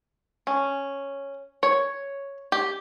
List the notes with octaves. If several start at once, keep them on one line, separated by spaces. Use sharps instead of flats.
C#4
C#5
G4